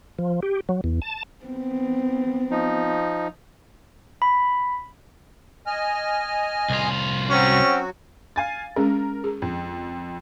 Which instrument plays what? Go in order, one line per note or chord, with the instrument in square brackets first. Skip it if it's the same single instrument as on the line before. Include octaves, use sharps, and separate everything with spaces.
[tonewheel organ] F3
G4
F#3
E2
A5
[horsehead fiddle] B3 C4
[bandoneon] F3 D#4
[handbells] B5
[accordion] D#5 G#5 F6
[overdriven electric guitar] C2 F4
[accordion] F#3 F#4 [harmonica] C4 C#4
[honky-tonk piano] F5 G#5 A6
[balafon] G#3 C#4 G#4 [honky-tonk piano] A#4
[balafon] G#4
[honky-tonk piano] F2